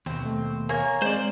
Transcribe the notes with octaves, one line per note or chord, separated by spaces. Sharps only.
D#2 B2 C4
A3
A#3 C#5 G#5
G#3 C4 C5 D5